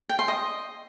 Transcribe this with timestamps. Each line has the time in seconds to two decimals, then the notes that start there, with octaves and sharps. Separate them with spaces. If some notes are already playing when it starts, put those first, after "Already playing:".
0.09 G5
0.19 C6
0.28 D#5